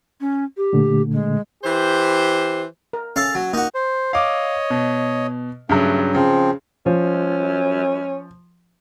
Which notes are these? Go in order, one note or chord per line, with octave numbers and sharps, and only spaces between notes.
C#4
G4
A#2 D3 A3
G#3
E3 G4 C5
A#4
C#4 A4 F5
F#3
A#3 D#4 F#4
C5
C#5 D#5 F5 D6
B2
G2 C#3 F#3 A3
C#3 F3 C4
F3 C#4